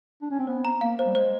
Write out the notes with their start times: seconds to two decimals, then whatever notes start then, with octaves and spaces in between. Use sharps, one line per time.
0.22 D4
0.31 C#4
0.39 C4
0.47 B3 C5
0.65 A#5
0.81 A#3 F5
0.99 C5
1.06 G3
1.15 G#3 C5